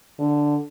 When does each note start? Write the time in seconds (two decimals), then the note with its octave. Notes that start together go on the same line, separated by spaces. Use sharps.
0.19 D3